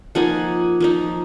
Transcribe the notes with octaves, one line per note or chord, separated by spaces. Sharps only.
F3 A#3 D#4 F#5 G#5
F3 A#3 D#4